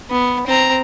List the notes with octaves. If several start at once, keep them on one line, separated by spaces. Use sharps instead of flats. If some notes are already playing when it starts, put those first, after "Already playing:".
B3
C4 A#5